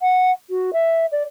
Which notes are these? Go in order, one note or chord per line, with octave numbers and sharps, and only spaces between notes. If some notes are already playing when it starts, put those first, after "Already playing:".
F#5
F#4
E5
D5